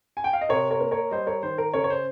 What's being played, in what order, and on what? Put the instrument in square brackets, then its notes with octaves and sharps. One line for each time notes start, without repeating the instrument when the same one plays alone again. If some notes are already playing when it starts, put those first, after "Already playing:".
[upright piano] G#5
G5
F5
D#5
C3 A#4 C#5
A#4 C#5
A#3
A#4 C#5
G3 C5 D#5
A#4 C#5
D#3 C5
A#4
C#3 A#4 C#5
C#5
C5